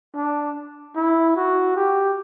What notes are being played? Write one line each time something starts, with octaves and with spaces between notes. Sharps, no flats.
D4
E4
F#4
G4